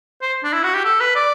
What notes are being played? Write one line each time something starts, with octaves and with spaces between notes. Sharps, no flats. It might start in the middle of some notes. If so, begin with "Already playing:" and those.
C5
D4
E4
F#4
G4
A4
B4
D5